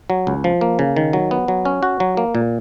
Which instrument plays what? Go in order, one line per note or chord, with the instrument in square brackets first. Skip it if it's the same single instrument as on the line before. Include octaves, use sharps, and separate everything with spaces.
[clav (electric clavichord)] F#3
C#2
F3
A#3
C#3
D#3
F#3
B3
F#3
C#4
F#4
F#3
A#3
A#2